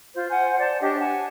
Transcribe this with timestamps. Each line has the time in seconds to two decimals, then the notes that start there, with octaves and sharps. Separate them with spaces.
0.15 F4 C5
0.29 C5 F#5 G#5
0.58 C5 D5 A5
0.81 D4 G4 C#5 D#5
0.99 F#5 G#5 A5